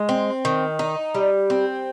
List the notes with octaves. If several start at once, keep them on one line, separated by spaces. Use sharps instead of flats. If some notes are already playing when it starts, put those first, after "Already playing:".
Already playing: G#3
C4
D#3
D#4
G3
C4